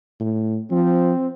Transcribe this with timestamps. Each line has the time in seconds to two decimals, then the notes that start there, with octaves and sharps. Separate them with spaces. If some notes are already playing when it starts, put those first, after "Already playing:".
0.20 A2
0.71 F3 C4